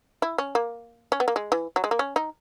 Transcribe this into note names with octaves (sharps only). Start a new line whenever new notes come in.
E4
C#4
A#3
C#4
B3
A#3
G#3
E3
F#3
G#3
A#3
C#4
D#4